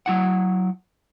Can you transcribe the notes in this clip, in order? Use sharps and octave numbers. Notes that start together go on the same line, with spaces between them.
F#3 E4 F#5